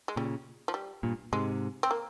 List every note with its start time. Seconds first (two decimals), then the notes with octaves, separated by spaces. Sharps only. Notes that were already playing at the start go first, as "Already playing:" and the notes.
0.08 G#3
0.16 A#2 C#3 G3
0.68 F3
0.74 G3
1.03 G2 A#2
1.33 G#2 C3 G#3
1.83 C4
1.91 A#3